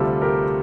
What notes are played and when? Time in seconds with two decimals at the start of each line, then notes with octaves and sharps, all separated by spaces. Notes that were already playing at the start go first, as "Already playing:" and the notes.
Already playing: D2 C3 G3 F4 A4
0.21 G4 A#4